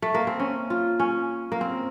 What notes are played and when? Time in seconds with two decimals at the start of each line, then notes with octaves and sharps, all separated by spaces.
0.02 A3
0.14 A#3
0.27 C4
0.40 C#4
0.70 F4
1.00 C#4
1.52 A#3
1.61 C4